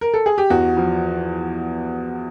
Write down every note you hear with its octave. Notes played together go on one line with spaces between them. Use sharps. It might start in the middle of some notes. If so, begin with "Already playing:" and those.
A#4
A4
G#4
G4
E2 F#4
F3